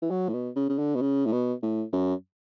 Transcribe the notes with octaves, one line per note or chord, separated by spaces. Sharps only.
E3
F#3
A2
B2
C#3
C#3
D3
B2
C#3
A2
B2
A2
F#2